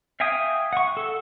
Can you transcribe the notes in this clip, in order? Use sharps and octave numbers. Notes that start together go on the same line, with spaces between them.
E5 F5 G5 G#5 D#6
F#5 C#6
A4